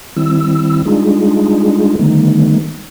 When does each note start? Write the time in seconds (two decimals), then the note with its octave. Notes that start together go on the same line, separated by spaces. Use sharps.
0.17 D#3 G3 C4 E4 E6
0.85 G3 G#3 D4 D#4 F4 G#4
1.99 D3 D#3 G3 A3 B3 D#4